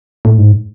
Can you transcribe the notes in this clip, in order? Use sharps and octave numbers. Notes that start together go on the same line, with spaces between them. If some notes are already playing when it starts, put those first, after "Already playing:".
A2
G#2